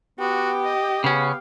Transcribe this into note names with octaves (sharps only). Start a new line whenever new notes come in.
B3 F#4 G4
D#5
C#3 B3 C#4 F5